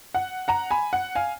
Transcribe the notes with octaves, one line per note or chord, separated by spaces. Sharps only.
F#5
F#5 A#5
G#5 B5
F#5
F5 G#5